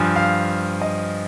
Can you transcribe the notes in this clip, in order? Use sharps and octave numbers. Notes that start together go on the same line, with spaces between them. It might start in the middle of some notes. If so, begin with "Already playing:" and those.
Already playing: G2 F3 G#5
F5
D#5